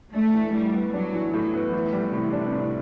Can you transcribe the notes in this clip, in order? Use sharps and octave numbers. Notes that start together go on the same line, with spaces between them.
A3 D4
E3
A2 G3
B3
F#3 D4
E3
A2 F#3
B3
A2 E3
G3
A2 C3
D4
A2